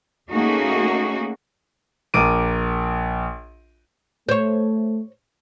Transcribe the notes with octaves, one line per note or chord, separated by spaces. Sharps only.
A3 A#3 C#4 D#4 F#4 G#4
A#1 A#4 D6 D7 D#7
A3 C5 C#5